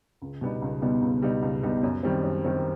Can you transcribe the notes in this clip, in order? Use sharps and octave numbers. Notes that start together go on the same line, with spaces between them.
C#2
B2 G3 B3 D#4
C#2
B2 G3 B3 D#4
C#2
B2 G3 B3 D#4
C#2
B2 G3 B3 D#4
F#2
D#3 G3 C4
F#2
D#3 G3 C4